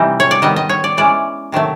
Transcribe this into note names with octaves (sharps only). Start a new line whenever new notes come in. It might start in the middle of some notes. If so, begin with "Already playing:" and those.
Already playing: C3 E3 G3 C4 D#4
C#5
D5
D#3 G3 B3 D#5
D#5
C#5
D5
E3 G#3 C#4 D5
C3 D#3 F#3 A3